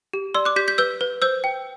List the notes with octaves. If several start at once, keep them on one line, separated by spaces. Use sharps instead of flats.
G4
D5 C6 E6
D6 F#6
G4 G6 B6
G6 B6
B4 E6 G6
B4
C5 E6 G6
G5